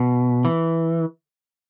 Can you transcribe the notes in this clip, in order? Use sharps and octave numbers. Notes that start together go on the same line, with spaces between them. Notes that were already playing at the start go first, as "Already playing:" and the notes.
Already playing: B2
E3